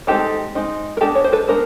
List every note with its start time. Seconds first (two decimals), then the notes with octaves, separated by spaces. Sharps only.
0.07 G#3 C4 D#4 G4 A4
0.55 G#3 C4 D#4
0.97 A#4
1.01 G#3 B3 D4 G4 A4
1.15 C#5
1.24 C5
1.33 A4 B4
1.48 G#3 B3 D4 A#4 C5